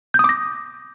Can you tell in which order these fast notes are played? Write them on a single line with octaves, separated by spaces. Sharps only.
G6 D#6 D6 A#6